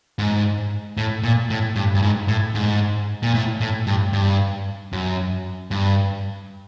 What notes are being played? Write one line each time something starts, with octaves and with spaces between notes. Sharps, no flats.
G#2
A2
A#2
A2
G2
G2
G#2
A2
G#2
A#2
A2
A2
G2
G2
F#2
G2